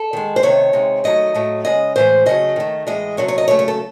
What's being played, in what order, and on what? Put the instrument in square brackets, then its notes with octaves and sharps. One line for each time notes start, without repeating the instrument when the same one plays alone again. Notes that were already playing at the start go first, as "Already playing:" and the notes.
Already playing: [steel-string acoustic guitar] A4
D#3 G#3
C5
C3 D#3 A3 C#5
C3 D#3 G#3
D#3 F#3 A3 D#5
A2 F#3 A3
C#3 G#3 D#5
A2 E3 G#3 C5
C#3 F#3 A3 D#5
D#3 A3
A2 E3 G#3 D#5
C3 F#3 A3 C#5
C#5
D#5
C#3 F#3 A3 C#5
C#5
A4